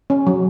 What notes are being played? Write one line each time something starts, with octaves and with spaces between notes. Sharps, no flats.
C#4
F#3